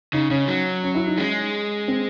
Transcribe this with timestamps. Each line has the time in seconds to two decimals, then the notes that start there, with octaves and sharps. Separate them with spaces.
0.13 C#3 D#4
0.31 C#3 C#4
0.48 F#3
0.83 C#4
0.95 E4
1.06 D#4
1.17 G#3 C#4
1.88 C4